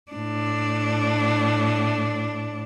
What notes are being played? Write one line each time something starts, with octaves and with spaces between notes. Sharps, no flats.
A2 D4